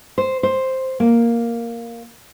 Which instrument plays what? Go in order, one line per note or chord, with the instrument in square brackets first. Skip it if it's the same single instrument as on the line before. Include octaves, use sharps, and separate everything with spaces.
[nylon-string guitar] C5
C5
A#3